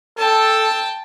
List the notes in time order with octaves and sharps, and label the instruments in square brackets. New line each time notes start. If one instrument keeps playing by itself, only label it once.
[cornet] A4 [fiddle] G5 A5